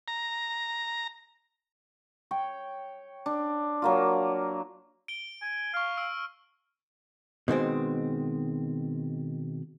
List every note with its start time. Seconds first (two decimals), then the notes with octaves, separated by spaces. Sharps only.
0.08 A#5
2.31 C#5 G5
3.26 D4
3.82 F#3 A#3 F4
5.08 D7 G7
5.42 G#5
5.74 F5 C#6 F6
5.97 E6 D7
7.48 B2 D#3 G#3 C4